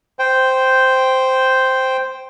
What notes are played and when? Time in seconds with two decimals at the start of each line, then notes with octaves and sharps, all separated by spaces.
0.19 C5 G5